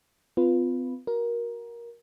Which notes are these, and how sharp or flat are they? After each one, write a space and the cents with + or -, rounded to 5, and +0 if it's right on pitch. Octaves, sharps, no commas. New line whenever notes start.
C4 -45 F4 +0 B4 +0
F#4 +0 A#4 +15